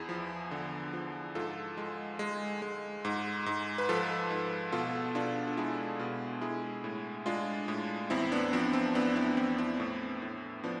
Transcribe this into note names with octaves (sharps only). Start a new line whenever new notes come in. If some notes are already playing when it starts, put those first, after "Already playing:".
Already playing: E2 E4 G#4
F3
D3
F3
G#2 F4 A4
G#3
G#3
G#3
G#2
G#2
B4
F3 F4 A4
G#2
B2 F4 A4
B2 D4 F4
A4
G#3 E4 G#4
B2
G#3 E4 G#4
A2
G#3 D4 F4
A2
E2 C4 E4
B3 D4
F3 C4
C4
E2 B3 D4
C4 E4
E2 C4
C4 E4
A2
A2
F3 B3 D4